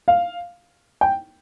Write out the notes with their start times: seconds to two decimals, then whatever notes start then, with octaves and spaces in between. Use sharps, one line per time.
0.08 F5
1.01 G5